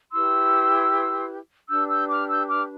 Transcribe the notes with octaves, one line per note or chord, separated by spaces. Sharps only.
E4 G4 B4 C6 E6
D4 G4 B4 E6 G6
E6 G6
D6 F6
E6 G6
D6 F6